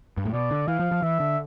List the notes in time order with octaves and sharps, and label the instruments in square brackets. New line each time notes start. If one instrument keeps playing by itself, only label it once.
[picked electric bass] G2
A2
[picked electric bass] B2 [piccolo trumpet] D5
[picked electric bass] D3
[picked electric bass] E3 [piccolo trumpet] F5
[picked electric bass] F3
F3
[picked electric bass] E3 [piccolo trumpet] E5
[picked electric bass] D3